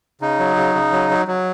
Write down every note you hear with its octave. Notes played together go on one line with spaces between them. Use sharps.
C#3 D#4
F#3
C#3
C#3
F#3
F#3
F#3